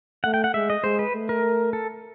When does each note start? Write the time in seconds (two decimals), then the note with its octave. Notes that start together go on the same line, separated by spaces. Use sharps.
0.24 A3 F#5
0.34 G5
0.44 F#5
0.54 G#3 E5
0.70 D#5
0.84 G#3 C5
0.99 B4
1.14 A3
1.29 A#4
1.73 A4